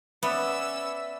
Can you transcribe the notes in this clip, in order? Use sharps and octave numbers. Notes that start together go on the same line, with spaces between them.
B3 C#4 B4 D5 E5 E6